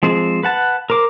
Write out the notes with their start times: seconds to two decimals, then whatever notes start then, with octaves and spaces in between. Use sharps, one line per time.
0.03 F3 G#3 C4 C5
0.43 B4 F#5 A5
0.90 A#4 C5 D6